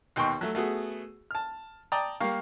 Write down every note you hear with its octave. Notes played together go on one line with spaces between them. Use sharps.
D#2 B2 G5 C6 C#6
F#3 A3
A3 B3 F#4 G#4
A5 F6
D5 G5 A5 A#5 D#6
G3 A#3 F5 C#6